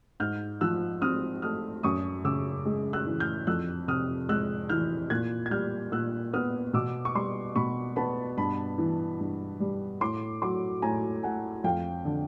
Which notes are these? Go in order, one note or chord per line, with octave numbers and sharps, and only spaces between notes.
G#2 F6 G6
F3 E6 F#6
C4 D#6 F6
A3 D#6 F6
F#2 C#6 D#6
C#3 D6 E6
G#3
E6 F#6
E3
F6 G6
F2 E6 F#6
C3 D#6 F6
G#3 E6 F#6
E3 F6 G6
A#2 F#6 G#6
G#6
G3 F6 G6
A#2 E6 F#6
B3 D#6 F6
B2 D6 E6
C#6
G3 C6 D6
B2 B5 C#6
B3 A5 B5
G2 A5 B5
E3
G2
G3
A2 C6 D6
F#3 C6 D6
A2 G#5 A#5
A3 F#5 G#5
F2 F5 G5
D3